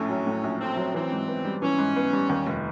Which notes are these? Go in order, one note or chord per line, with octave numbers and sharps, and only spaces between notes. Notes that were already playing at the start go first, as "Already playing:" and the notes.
Already playing: A#1 A2 A3 C#4
F#3
A2
A#1
A3 C4
F#3
E3 C4
G#2
B3
G3
E3 C#4
G#2
B3
G3
D#2
F1